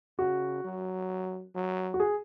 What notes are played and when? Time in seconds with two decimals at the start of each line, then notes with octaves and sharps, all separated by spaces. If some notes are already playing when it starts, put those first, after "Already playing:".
0.18 C#3 F#4
0.64 F#3
1.55 F#3
1.94 F#4
2.00 G#4